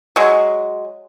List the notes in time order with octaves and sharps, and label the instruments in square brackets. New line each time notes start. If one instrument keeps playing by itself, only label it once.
[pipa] F#3 G#3